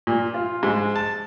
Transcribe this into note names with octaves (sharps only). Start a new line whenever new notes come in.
A#2
F4
G#2
A5